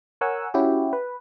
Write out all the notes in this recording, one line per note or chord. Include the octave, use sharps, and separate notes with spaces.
A#4 C#5 F#5 G#5 E6
C#4 E4 F#4 G4
B4